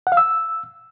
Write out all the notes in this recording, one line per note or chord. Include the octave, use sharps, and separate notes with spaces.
F#5
F5
E6